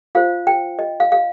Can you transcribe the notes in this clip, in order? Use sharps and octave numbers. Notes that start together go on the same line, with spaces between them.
F4 C5 F5
G5
D#5
F5
F5